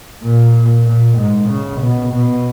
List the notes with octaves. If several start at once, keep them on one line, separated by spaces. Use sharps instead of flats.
A#2
A#2
G#2
C#3
B2
B2